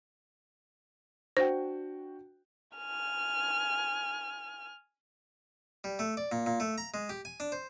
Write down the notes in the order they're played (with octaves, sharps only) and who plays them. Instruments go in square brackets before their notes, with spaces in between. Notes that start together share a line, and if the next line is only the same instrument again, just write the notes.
[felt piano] D4 F#4 G5 [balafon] C5
[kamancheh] G#5 F6
[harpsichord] G3
A3
D5
A#2
A#2
A3
A#5
G#3
G4
G#5
D4
C5